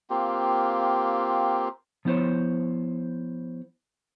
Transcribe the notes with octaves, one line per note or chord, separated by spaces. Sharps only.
A#3 C4 F4 G4
F3 B3 E4 C5 C#5